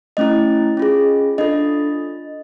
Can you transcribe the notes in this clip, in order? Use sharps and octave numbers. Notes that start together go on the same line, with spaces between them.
A3 C#4 E4 D#5
C#4 F4 G#4
D4 F4 A4 D#5